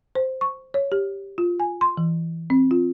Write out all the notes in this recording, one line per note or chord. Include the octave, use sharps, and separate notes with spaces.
C5
C#6
C#5
G4
F4
G#5
C6
E3
C4
F4